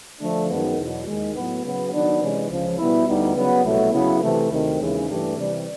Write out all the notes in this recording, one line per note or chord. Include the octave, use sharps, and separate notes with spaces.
D3 F3 A3 D4
F#2 D#3 G#3 B3
E2 B2 F#3
D#2 D#3 G#3
A2 F#3 B3
C#3 F#3 B3
D#3 F#3 B3 D4
C3 E3 G#3 C#4
C#2 C#3 F3
B2 G3 B3 E4
D2 D3 G3 B3 D#4
C#3 F#3 B3
C2 B2 F#3 A3
C#3 F#3 B3 E4
C3 E3 A3
D2 C3 D#3
D#2 C#3 E3 G#3 C#4
G2 E3 A3 D4 G4
C3 E3 G3